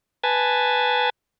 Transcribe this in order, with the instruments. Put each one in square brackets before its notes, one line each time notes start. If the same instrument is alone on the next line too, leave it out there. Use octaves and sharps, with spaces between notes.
[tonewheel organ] B4 G#5 A5